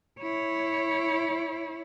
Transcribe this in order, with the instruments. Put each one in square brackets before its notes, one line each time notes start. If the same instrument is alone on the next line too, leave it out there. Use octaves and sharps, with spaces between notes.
[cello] E4 C#5